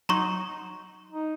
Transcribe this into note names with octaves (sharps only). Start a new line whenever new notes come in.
F#3 D#4 A#5 C6 C#6
D#4